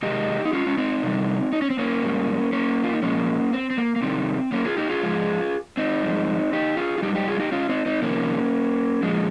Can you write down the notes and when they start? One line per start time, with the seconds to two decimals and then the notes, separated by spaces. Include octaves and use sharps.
0.02 C3 D#3 G#3 D#4 G4
0.45 D#4
0.53 C#4 F4
0.67 C#4
0.78 C4 D#4
1.03 C3 D#3 G3
1.52 D#4
1.62 C#4
1.70 C4
1.79 A#3 C#4
2.02 G#2 G3
2.53 A#3 C#4
2.83 F4
2.93 D#4
3.02 A#2 F3 G#3 A#3 C#4
3.53 C4
3.70 C4
3.78 A#3
3.96 A#3
4.02 C3 D#3 G3 C4
4.52 A#3 C#4
4.65 F4 G#4
4.77 D#4 G4
4.90 F4 G#4
5.02 G#2 F3 G#3
5.77 C4 D#4
6.03 G2 F3 G#3
6.53 D#4 G4
6.77 F4 G#4
6.98 F4
7.02 G3 D#4 G4
7.07 G#2
7.15 D#4 G4
7.28 F4 G#4
7.40 D#4 G4
7.52 C#4 F4
7.69 C4 D#4
7.86 C4 D#4
8.02 F2 C3 D#3 A#3 C#4
9.03 A#2 F3 G#3